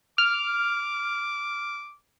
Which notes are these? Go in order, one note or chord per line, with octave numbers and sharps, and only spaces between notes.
D6 F6